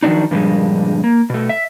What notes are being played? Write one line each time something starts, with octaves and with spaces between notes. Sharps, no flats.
D#3 F3 F#3 D4 D#4
G2 A#2 D3 F3 G3 G#3
A#3
B2 A3
E5